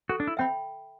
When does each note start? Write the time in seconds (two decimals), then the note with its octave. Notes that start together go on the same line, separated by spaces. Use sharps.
0.09 F#4 A4
0.20 D4
0.27 E4
0.37 C4 E5 G5 B5